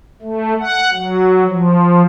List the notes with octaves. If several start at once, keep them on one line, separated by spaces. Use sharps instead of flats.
A3
F#5
F#3
F3